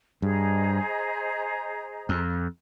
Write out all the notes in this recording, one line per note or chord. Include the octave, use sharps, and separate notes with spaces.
G2 G#4 C5 D#5 A#5
F2